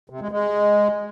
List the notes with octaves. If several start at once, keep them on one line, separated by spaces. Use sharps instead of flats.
C3
G#3
G#3